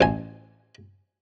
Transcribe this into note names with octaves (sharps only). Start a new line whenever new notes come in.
A1 G#5